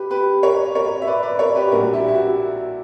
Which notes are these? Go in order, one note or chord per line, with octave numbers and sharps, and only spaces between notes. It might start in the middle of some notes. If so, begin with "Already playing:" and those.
Already playing: G4 B4
G4 B4
A#4 C#5
A#4 C#5
E5
B4 D5
B4 D5
A#4 C#5
G4 B4
A#1 A#2 G3 F#4 A#4
E4 G4
E4
F#4